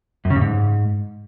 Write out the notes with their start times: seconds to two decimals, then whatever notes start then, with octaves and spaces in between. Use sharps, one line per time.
0.25 F#2
0.30 C#3
0.36 G2
0.41 G#2